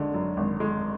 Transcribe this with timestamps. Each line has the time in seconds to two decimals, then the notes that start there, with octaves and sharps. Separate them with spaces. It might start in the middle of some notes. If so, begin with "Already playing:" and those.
Already playing: G#1 D3 G#3
0.14 F#2
0.37 G#1
0.60 G#3